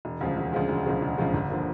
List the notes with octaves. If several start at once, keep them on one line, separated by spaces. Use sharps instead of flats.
E1
D2 C#3 F3 G#3
E1
D2 C#3 F3 G#3
E1
D2 C#3 F3 G#3
E1
D2 C#3 F3 G#3
G1
D3 F3 A#3